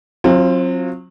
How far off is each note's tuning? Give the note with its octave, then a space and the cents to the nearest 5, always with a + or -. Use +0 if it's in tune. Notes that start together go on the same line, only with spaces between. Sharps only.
F#3 -25 C4 +30 F4 -15